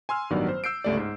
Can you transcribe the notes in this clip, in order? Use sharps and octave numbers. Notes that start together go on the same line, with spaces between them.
G#5 C6 E6 F6
A1 G2 D#3 F#3 B3 D5
C5
E6 G6 C7 D7
G1 C#2 A3 G4 D5
G#2